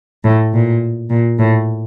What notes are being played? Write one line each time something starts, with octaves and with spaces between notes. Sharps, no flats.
A2
A#2
A#2
A2